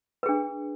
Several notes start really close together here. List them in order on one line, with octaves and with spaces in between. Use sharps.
B4 G#4 D4